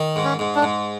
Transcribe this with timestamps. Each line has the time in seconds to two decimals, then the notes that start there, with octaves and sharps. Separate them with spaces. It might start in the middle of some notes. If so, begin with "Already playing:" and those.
Already playing: D#3
0.16 G#2
0.24 C#4
0.39 G#2
0.55 D4
0.62 G#2